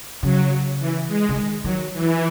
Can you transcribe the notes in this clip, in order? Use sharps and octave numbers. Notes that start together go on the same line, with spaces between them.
C#3 F#3
E3
G#3
C#3
D#3
D#3 F#3
E3